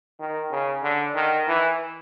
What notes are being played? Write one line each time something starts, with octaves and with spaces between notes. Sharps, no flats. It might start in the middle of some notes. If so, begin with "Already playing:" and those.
D#3
C#3
D3
D#3
E3